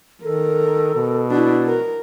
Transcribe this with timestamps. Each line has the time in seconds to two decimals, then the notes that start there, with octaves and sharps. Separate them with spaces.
0.24 D#3 A4 A#4
0.96 B2
1.31 D4 E4 F#4
1.67 A#4